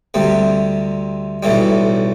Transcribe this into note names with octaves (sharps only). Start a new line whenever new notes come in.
D2 C3 G3
B1 A2 E3 G3